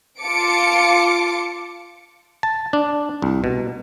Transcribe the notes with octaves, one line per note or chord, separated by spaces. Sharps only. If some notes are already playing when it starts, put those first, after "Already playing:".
F4 A5 D6 C#7 D7
A5
D4
C2
B2